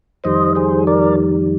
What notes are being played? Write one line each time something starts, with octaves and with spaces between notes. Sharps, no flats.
F2 D#3 G3 C5 D#5
G#4 C5
A#4 D5